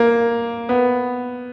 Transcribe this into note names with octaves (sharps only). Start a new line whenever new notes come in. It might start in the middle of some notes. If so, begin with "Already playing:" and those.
Already playing: A#3
B3